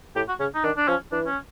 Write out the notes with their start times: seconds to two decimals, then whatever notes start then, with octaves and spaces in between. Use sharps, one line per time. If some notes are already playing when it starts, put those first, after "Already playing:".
0.15 A2 G4
0.28 F#4
0.40 C#3 C#4
0.55 D#4
0.64 D#3 D4
0.77 D4
0.88 F3 C#4
1.12 E3 D4
1.26 C#4